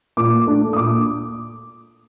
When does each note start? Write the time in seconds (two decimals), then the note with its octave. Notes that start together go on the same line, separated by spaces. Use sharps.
0.17 A#2 D6
0.46 A3 D4
0.73 D#6
0.77 A#2 D6